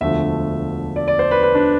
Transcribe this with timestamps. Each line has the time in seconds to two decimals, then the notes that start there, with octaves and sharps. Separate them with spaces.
0.01 E1 D2 D3 F3 A3 E5
0.96 D5
1.08 D5
1.19 C5
1.31 B4
1.43 B4
1.55 D4